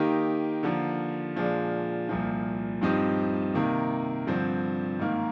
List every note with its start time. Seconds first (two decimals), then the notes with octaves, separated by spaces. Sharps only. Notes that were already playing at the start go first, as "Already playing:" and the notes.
Already playing: D#3 A#3 D#4 G4
0.63 D3 F3 A#3
1.36 A#2 F3 G#3 D4 F4
2.09 C2 A#2 F3
2.81 G2 F3 C4 D#4 G4
3.54 C3 D#3 A#3
4.27 G2 D3 F3 C4
5.00 G#2 D#3 A#3